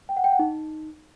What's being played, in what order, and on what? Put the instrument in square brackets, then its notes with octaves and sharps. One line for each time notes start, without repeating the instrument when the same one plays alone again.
[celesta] G5
F#5
G5
F#5
D#4